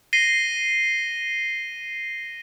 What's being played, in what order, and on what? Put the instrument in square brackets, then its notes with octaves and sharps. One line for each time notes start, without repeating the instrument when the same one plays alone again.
[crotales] A#6 C7 D#7 G7